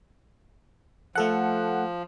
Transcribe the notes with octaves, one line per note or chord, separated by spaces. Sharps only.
F3 A3 A4 F#5